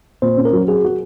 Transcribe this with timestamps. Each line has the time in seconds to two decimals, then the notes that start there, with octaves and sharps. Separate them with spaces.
0.22 A#2 C5
0.37 C#4
0.45 A#4
0.53 F#3
0.68 F#4 G#4
0.84 F#4